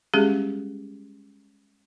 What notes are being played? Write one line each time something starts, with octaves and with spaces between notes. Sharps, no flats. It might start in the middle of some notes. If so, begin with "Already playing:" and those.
G3 G#3 C#4 G4 G#4